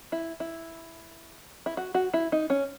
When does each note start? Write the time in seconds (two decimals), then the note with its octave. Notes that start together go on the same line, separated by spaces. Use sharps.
0.12 E4
0.40 E4
1.66 E4
1.77 F#4
1.95 F#4
2.14 E4
2.32 D#4
2.50 C#4